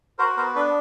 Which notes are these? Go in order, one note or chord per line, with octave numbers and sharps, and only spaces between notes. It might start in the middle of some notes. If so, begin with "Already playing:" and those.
F#4 A#4 C5
B3 A#4 C5
D4 A4 B4